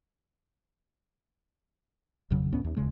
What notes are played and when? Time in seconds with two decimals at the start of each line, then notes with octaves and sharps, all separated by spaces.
2.30 G#1 F2 C#3 F#3
2.52 D2 A2 B3 C#4
2.64 D#2
2.76 D1 D#2 C#3 G#3